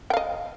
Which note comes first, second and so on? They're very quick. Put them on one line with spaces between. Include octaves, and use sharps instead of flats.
G5 F5 D#5